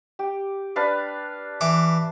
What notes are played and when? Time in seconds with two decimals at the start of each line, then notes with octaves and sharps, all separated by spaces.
0.19 G4
0.76 D4 B4 F5
1.61 E3 D6